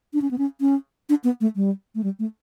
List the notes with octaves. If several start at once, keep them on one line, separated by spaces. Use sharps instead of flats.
D4
C#4
B3
C#4
C#4
D4
B3
A3
G3
A3
G3
A3